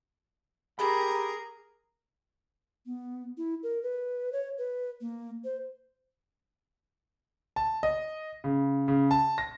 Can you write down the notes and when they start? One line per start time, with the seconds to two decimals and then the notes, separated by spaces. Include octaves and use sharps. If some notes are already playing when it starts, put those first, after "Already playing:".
0.79 G4 G#4 A#4 A#5 B5
2.86 B3
3.38 E4
3.63 A#4
3.83 B4
4.33 C#5
4.58 B4
5.01 A#3
5.44 C5
7.56 A5
7.83 D#5
8.44 C#3
8.88 C#3
9.11 A5
9.38 A#6